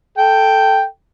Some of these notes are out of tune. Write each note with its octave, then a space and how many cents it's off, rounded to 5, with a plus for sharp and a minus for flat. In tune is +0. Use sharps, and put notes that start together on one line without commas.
A4 +0 G5 +0